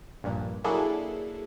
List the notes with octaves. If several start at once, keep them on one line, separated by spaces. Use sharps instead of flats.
A#1 G2 A#2
F#3 A#3 D4 E4 G#4 A4